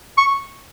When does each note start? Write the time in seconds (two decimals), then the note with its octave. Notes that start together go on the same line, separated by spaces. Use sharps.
0.18 C#6